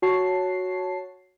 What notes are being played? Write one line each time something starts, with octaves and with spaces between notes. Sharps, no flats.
F#4 C#5 A5 C7